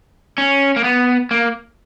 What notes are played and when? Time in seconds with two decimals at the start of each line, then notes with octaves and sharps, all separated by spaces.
0.38 C#4
0.76 A#3
0.84 B3
1.31 A#3